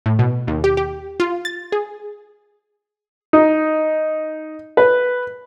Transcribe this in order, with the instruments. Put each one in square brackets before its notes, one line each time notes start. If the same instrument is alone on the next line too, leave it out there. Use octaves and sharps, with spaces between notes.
[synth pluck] A2
B2
D#2
G4
G4
F4
A6
G#4
[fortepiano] D#4
B4